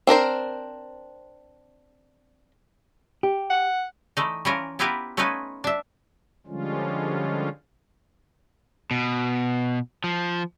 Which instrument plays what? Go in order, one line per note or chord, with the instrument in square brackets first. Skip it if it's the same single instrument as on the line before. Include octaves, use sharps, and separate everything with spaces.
[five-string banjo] C4 D4 A#4 C5
[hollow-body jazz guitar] G4
[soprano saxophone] F#5
[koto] E3 A3 D#4
E3 F3 C#4 F4 A#4
B3 E4 F4 G4 A#4 B4
A3 C#4 D#4 F4 B4 G#5
D4 E5
[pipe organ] D3 F3 G3 G#3 C#4 F4
[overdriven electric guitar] B2
F3